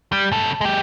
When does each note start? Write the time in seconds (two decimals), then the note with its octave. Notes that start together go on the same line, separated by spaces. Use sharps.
0.12 G3
0.32 C#3 A4
0.61 G#3 G4